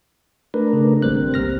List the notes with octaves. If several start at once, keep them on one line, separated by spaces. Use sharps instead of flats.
A3 D4 A#4 B4
C#3
G#1 G3 A#3 C4 C5 F#6
C2 F6 A#6